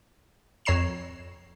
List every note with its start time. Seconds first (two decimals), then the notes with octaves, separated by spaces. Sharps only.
0.65 F2 C#5 A#5 C7 E7